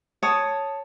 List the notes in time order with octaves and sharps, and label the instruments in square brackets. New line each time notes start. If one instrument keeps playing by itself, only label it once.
[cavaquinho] C#5 A5 D#6